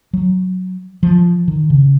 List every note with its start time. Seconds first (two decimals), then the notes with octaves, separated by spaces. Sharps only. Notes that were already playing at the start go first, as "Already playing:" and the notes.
0.13 F#3
1.03 F3
1.48 D#3
1.70 C#3